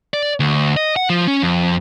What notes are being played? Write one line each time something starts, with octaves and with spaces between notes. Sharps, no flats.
D5
D2
D#5
F#5
F3
C#4
F2